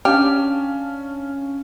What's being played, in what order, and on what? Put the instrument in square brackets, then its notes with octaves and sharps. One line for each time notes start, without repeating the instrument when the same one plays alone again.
[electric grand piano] C#4 [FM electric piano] D4 F5 A5 [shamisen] G4 [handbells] F6